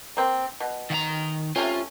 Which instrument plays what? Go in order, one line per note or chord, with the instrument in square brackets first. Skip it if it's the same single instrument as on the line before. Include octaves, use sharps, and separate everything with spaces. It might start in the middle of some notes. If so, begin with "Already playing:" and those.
[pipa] A#3 C4
B2
[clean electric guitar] D#3 F#5 A#5
[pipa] C3 A3 C#4 [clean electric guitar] F4